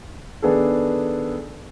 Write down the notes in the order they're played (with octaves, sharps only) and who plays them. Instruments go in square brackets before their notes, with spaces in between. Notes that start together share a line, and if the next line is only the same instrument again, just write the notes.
[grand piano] D#3 B3 D4 G#4 A4